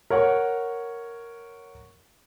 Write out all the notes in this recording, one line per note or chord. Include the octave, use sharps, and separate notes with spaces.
A#4 C#5 F#5 C#6